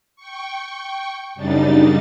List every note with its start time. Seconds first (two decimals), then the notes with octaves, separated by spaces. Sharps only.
0.16 G5 C#6
1.35 F#2 C#3 G3 D4 D#4 A6